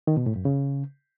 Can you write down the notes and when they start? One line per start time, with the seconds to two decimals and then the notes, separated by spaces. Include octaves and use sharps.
0.07 D#3
0.17 B2
0.26 A2
0.36 F#2
0.45 C#3